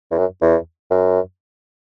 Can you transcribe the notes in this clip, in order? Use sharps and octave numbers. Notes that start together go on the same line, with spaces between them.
E2
F#2
E2
F#2